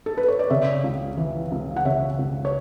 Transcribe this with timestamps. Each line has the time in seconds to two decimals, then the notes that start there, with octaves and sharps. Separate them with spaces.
0.06 A4
0.17 B4
0.28 C#5
0.39 D5
0.50 C#3 C#5 E5
0.84 C#2
1.17 E3
1.52 C#2
1.76 F#5
1.85 C#3 C#5 E5
2.19 C#2
2.45 C#5